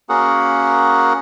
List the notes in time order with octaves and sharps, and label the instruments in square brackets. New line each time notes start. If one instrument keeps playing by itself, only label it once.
[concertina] A#3 C#4 F#4 G#4 A#4 F#5